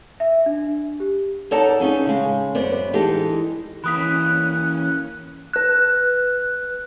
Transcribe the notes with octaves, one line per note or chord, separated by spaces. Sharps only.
E5
D4
G4
D#4 A4 C#5 D5 F#5 A5
B3 C#4 D#4 G#4
C#3 G#3
F#2 B3 C5 D5
E3 G#3 D4 D#4 G4 A4
E3 A#3 C#4 B5 D#6 F#6 B6
B4 F#6